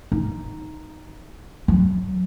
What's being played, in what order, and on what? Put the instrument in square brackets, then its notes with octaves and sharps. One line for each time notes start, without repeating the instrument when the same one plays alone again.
[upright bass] D#4
F#3